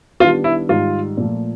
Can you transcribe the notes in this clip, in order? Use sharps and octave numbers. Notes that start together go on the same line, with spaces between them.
D#3 G3 B3 D4 F4 G4
E4
G#2 D#3 G3 F4
A#2 F3 A3